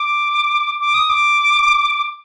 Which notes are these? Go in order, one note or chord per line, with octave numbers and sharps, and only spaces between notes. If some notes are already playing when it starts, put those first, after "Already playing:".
Already playing: D6
D6
D#6
D6